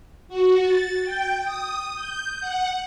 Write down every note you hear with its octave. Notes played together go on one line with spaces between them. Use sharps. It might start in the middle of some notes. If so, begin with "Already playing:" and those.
F#4
A6
G5
D#6
G6
F#5